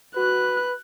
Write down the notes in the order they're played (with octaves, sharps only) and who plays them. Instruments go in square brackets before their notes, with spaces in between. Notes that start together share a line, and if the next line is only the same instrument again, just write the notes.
[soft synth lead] F#4 [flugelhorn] B4 [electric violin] F#6